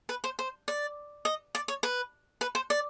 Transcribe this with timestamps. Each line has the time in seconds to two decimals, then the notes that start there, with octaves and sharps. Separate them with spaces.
0.09 B4
0.24 C5
0.39 C5
0.68 D5
1.25 D#5
1.55 D5
1.68 C#5
1.83 B4
2.41 B4
2.55 C5
2.70 D5